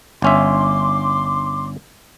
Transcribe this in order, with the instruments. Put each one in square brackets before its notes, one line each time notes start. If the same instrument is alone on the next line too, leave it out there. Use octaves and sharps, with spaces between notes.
[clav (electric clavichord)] G1 C#4 E5 [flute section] C6 D6